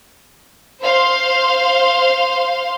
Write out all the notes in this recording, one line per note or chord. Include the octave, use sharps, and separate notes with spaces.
C5 F5 C6